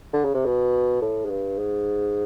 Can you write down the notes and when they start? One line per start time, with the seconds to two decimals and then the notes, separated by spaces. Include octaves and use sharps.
0.13 D3
0.25 C#3
0.34 C3
0.45 B2
1.02 A2
1.25 G#2
1.30 G2
1.58 G#2